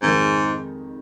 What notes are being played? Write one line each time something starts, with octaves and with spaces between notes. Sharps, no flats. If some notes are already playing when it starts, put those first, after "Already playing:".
F2 G#2 D#3 G#3 D#4